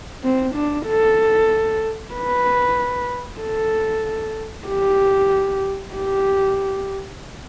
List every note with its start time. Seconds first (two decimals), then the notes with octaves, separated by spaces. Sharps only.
0.24 C4
0.55 D4
0.87 A4
2.14 B4
3.41 A4
4.67 G4
5.94 G4